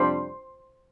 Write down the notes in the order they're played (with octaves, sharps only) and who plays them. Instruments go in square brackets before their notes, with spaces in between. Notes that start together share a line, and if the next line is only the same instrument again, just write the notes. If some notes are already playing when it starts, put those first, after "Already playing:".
Already playing: [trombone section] F2 C3 G3 D4 [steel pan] C5 C6